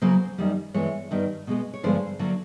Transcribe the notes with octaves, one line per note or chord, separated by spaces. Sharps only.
C#3 F#3 A#3 C5
F#2 D#3 G3 A#3
G2 E3 G#3 B3 C#5
G2 D#3 G3 B3
B2 G#3 B3
C#5
G2 D3 F3 G#3 B3 C5
D3 F#3 A#3